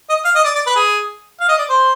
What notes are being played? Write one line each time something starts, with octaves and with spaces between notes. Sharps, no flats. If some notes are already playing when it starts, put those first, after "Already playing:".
D#5
F5
D#5
D5
D5
B4
G#4
F5
D#5
D5
C5